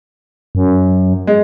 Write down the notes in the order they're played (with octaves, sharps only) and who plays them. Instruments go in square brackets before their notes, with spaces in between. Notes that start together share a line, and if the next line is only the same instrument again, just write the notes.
[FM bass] F#2
[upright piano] G#3